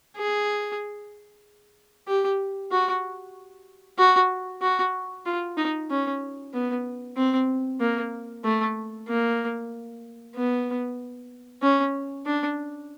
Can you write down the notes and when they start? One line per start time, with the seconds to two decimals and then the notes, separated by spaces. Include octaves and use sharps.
0.17 G#4
2.08 G4
2.72 F#4
3.99 F#4
4.62 F#4
5.26 F4
5.57 D#4
5.90 C#4
6.53 B3
7.17 C4
7.80 A#3
8.44 A3
9.08 A#3
10.36 B3
11.63 C#4
12.26 D4